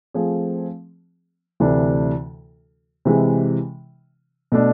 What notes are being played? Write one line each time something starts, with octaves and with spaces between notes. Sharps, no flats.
F3 A3 C4 G#4
D2 C3 E3 A3 D4
C3 E3 G#3
B2 A3 D4